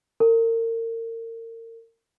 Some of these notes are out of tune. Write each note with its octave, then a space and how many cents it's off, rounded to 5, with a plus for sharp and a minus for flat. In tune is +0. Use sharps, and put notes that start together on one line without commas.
A#4 -35